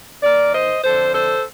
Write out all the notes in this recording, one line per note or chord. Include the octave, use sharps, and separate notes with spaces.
D#2 D#3 A#4 D5
C5 D#5
F2 D3 A4 C5
A4 C5